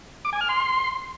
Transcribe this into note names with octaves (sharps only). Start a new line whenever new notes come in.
D6
G#5
F6
C6